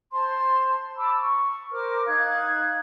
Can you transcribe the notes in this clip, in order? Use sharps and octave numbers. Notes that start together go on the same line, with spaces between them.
C5 A5 C6
A5 B5 D6 E6
C#6
A#4 C5 D6 F6
D#4 F5 F#6 G#6